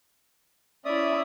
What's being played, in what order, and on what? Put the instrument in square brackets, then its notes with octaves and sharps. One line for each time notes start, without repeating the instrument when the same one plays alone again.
[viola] C#4 E4 [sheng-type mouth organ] D5 E5 D#6